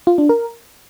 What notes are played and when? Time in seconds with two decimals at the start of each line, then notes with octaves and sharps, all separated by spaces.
0.07 F4
0.18 D4
0.29 A#4